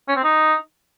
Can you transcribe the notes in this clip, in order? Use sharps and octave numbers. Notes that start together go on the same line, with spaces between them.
C#4
C4
D#4